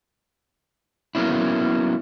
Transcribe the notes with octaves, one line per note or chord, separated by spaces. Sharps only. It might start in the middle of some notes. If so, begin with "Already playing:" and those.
F#3 A#3 B3 C#4 E4